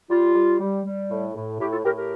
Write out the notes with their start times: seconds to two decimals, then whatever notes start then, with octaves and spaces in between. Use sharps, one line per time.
0.10 G3 F4
0.35 G3
0.61 G3
0.85 G3
1.10 A2
1.35 A2
1.60 A2 G4
1.72 F4 A4
1.84 A2 G4 A#4
1.98 G4 A#4